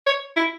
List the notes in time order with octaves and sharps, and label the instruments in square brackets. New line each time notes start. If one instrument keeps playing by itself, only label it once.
[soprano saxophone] C#5
E4